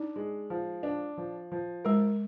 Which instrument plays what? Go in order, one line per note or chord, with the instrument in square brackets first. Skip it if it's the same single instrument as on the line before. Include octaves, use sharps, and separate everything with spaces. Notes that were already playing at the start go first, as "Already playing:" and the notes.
Already playing: [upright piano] D4 [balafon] D#4
[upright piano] G#3
F3
D4
F3
F3
[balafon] G#3 [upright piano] A#4